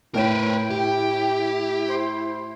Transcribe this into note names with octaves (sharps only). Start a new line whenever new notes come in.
A2 E4 A#4 B4 C#5 G5 D7
G4
C5